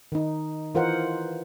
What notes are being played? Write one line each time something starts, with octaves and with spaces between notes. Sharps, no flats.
D#3 D#4
E3 F4 A#4 C5 D#5 F#5